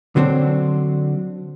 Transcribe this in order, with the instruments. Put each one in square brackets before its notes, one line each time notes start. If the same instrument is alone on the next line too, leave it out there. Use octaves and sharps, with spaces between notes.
[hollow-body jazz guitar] D3 F#3 C4 D4